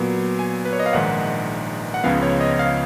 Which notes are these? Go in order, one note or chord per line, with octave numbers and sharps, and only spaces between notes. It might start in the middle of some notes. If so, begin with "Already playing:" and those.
Already playing: A#2 F#3 B3
G#5
B4
C#5
D#5
F5
A#1 G#2 D#3 G#3 F#5
F#5
C#2 C#3 F3 B3 F5
C#5
D#5
F5